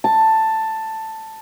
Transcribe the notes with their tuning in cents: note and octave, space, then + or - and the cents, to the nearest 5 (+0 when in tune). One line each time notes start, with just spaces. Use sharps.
A5 +10